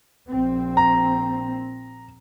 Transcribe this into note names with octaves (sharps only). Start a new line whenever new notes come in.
A#1 C4
A#5